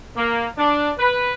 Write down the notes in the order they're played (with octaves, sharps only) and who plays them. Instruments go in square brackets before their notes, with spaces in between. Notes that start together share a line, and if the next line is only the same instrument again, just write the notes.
[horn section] A#3
D4
B4